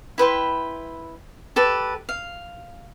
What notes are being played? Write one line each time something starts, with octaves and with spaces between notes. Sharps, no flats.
E4 B4 G5 C6
G4 A4 B4
F5